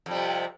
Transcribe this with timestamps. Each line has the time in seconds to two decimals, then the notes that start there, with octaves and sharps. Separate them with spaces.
0.06 F2
0.11 G3
0.15 C3